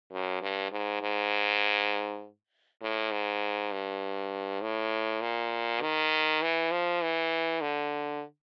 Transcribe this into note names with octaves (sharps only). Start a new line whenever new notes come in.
F#2
G2
G#2
G#2
A2
G#2
G2
A2
A#2
D#3
E3
F3
E3
D3